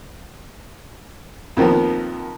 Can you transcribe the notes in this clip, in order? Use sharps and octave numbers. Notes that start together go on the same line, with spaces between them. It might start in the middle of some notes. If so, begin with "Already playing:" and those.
F2 D#3 F3 A#3 B3